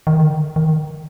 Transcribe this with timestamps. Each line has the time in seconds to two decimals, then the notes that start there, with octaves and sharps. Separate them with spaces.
0.07 D#3
0.18 D3
0.56 D#3